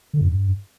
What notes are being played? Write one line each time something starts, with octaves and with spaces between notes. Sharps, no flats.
D3
F#2
G2